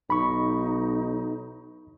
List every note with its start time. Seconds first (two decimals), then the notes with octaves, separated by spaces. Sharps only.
0.10 B1 D#4 B5 C#6